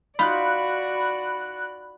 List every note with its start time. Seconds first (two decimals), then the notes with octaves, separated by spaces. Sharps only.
0.19 D#4 F4 F#4 D5 B5 F#6